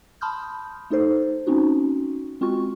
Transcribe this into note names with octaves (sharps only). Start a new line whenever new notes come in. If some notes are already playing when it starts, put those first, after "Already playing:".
A5 B5 C6 D#6 F6 G6
A3 D#4 A4 C5
A#3 C4 C#4 D#4 F#4
G#3 C4 F4 F#4 C#6